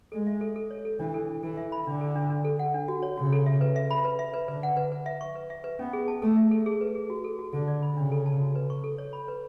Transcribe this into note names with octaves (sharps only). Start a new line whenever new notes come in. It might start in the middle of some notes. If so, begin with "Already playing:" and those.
G#3 A4
E5
A4
A4
C#5
A4
E3 D4
A4
D4
E3 A4
E5
B5
D3 D4
A4
D4
D4
A4
F#5
D4
F#4
C#5
C#3 F#4
A4
E5
B4
E5
B5
B4
E5
B4
D3 B4
F#5
B4
B4
E5
C#6
B4
E5
B4
B3 C#4
G#4
A5
A3 A4
E5
A4
G#4
B4
G#4
F#4
A4
F#4
D3 A4
D5
B5
C#3 D4
A4
A5
F#4
B4
C#6
A4
C#5
B5
B4